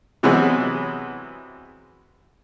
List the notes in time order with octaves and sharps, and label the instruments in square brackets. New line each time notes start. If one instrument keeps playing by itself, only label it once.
[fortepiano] C3 E3 F#3 G#3 B3